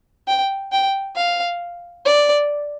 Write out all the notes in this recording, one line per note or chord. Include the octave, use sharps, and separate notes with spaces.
G5
G5
F5
D5